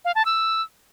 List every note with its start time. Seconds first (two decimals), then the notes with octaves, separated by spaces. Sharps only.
0.05 F5
0.15 A5
0.25 E6